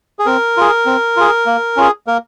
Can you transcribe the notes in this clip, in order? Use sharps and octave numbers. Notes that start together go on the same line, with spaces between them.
G#4
C4 A#4
F4 G#4
C4
F4 G#4
A#3
C#4 F4 G#4
A#3 A#4